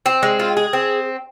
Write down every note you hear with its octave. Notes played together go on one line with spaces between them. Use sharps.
C4
G#3
F4
G#4
C4